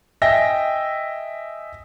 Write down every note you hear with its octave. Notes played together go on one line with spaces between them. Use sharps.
D#5 E5 G5 G#5 A#6